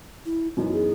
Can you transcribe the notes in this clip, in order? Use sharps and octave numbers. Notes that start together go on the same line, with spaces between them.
E4
F#2 E3 B3 D#4 F#4
G#4